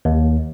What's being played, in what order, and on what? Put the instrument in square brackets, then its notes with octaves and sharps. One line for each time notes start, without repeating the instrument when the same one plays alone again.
[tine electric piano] D#2